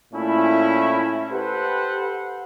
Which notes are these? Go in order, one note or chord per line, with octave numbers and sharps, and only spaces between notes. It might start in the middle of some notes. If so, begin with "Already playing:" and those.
A#2 A3 C#4 E4
G4 A4 B4 C5 F#5